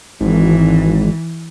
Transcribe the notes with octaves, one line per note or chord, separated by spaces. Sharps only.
G#1 E3